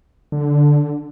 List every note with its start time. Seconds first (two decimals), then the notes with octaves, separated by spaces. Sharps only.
0.32 D3